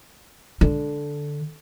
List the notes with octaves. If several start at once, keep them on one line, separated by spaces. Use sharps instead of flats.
D3